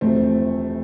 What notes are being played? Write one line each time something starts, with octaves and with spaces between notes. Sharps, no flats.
E1 D2 C3 F3 A3 C4